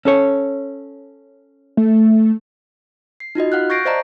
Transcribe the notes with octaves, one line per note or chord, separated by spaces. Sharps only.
C#4 A4 C#5
A3
C7
D#4 F4 F#4 D#5
F5 F#5 F6 F#6
C#6 G6 A6 A#6 C7 D7
C5 D5 D#5 F5 A5 A#5